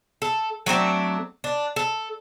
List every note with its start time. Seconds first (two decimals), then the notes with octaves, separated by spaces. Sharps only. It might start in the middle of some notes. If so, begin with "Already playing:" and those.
0.22 A4
0.66 F#3 A3 C4 D4
1.44 D4
1.76 A4